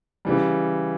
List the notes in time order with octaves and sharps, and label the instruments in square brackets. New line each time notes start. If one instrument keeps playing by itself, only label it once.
[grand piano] C#3 E3 G3